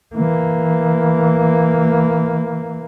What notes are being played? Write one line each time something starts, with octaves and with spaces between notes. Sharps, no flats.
E3 A#3